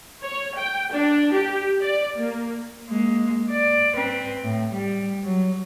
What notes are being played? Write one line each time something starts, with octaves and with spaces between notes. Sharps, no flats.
C#5
G5
D4
G4
D5
A#3
G#3 A#3
D5
C4 B4
A2
G3
F#3